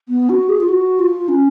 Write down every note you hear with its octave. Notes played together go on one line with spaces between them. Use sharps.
B3
F#4
G#4
F4
F#4
F4
C#4